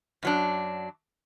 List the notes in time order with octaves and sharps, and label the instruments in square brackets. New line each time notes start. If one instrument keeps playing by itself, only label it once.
[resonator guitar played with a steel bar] F#2 F#3 D4